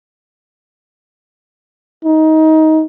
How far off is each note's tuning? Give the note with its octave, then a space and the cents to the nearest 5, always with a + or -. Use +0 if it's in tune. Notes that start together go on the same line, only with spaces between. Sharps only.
D#4 +20